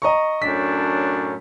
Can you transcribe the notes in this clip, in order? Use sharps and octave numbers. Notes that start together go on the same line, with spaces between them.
D#5 A#5 C#6
F#2 A2 D4 B6